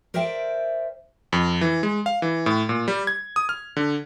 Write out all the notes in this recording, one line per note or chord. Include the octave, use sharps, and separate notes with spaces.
A#4 C5 D5 E5 G5
F2
E3
G#3
F5
E3
A2
A#2
G3
G#6
D#6
F6
D3